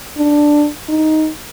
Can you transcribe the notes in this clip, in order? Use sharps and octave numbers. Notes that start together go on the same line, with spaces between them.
D4
D#4